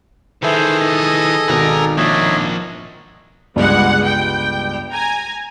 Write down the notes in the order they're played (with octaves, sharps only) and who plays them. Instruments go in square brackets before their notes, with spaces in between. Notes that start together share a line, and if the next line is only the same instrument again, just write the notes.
[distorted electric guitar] D#3 E3 [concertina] G#4 A4 [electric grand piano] B4 E5 G6 [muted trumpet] C5
[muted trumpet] D#5
[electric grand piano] G#1 B2 D#3 [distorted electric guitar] B4 A#5
[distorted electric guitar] F3 A#3 [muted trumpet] D4 [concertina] C#5 D#5 E5
[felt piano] G1 C#2 G2 [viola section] G3 G#3 F#5
[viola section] G5
G#5 A#5